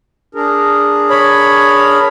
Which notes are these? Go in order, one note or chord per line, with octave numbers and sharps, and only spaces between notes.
D4 G#4 A#4
C#5 B5